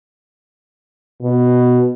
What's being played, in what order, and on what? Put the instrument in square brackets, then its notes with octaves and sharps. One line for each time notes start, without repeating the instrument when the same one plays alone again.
[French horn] B2